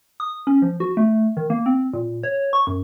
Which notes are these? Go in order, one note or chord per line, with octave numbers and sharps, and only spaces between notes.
D#6
C#4
F3
F#4
A3
D#3
A#3
C4
A#2
C#5
C#6
F#2